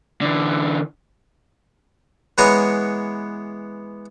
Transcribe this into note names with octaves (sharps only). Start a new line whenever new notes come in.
D3 E3
E3 G#3 B3 C#5 G#5 A#5